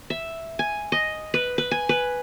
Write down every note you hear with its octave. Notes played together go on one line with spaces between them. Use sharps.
E5
G#5
D#5
B4
B4
G#5
B4